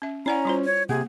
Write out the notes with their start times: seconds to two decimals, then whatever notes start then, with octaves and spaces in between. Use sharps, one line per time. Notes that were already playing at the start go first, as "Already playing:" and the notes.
0.02 C#4 E5
0.26 C#4 E4 D5 F#5 A#5
0.45 G3 F4 C5
0.65 C#5
0.89 C3 A#3 G#4 F#5